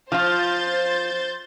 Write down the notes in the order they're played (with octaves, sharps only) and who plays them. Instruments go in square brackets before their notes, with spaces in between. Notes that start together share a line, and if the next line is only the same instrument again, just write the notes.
[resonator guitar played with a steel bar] F3 F4 [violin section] C5 G6 A6